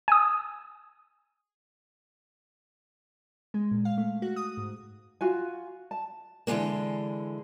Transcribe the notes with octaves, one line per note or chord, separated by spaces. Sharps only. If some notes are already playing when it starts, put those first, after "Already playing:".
G#5 D#6
G#3
A#2
F5
A3
F#4
D#6
G#2
F4 F#4 G#5
A5
D3 E3 F3 G#3 A#3